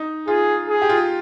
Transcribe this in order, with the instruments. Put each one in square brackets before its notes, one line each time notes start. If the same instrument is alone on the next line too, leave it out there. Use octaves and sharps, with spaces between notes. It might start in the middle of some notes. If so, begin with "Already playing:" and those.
Already playing: [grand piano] D#4
[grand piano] F4 [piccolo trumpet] G#4
[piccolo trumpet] G#4
[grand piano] G4
F4